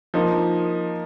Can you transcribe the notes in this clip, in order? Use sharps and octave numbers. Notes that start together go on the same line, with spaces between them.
F3 A#3 D#4